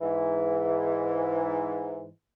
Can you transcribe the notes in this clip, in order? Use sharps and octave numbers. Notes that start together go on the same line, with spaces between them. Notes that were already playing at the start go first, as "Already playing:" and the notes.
G#2 E3